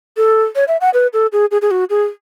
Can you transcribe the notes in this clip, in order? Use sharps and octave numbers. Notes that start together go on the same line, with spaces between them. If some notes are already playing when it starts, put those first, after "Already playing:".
A4
C#5
E5
F#5
B4
A4
G#4
G#4
G#4
F#4
G#4